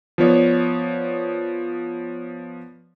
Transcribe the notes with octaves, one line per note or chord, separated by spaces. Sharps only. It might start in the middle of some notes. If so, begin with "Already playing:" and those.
F3 B3 C#5 D5